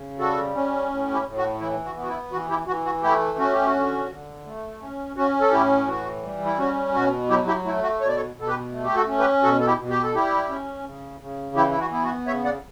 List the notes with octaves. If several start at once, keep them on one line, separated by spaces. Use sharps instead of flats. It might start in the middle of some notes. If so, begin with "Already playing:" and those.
Already playing: C#3
G3 F#4 A4
C#4
A2
E4 G4
A2
F#4
E3 E4
F#4
B3
F#4
E4
E3 F#4
E4 G4
E3 F#4
F#4
A3 E4 G4
C#4 F#4
G4
F#4
D3
D3
A3
C#4
C#4 F#4
A4
A2 E4 G4
E3 F#4
G3
E4
C#4 F#4
B2 F#4
F#3 E4 G4
E4 G4
A3 E4
F#4
B2 C#5
D5
A4 C#5
B2 A4
G4 B4
A3
G4
F#4 A4
C#4
G4 B4
B2 F#4 A4
A4
E4 G4
B2
G4
A4
G3 E4 G4
C#4
C#3
C#3
E3 E4 G4
E4
F#4
B3 E4
F#4
C#3 C#5 E5
D5 F#5